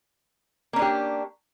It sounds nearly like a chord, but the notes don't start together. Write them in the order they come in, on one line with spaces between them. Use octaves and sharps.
A#3 C#4 D4 G4